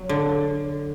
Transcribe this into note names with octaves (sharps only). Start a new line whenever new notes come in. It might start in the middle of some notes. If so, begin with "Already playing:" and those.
Already playing: F#3
D3